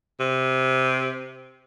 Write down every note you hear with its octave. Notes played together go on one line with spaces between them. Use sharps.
C3